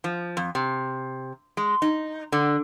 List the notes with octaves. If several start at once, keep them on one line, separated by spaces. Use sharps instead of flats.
F3
F2
C3
G#3
D#4
D3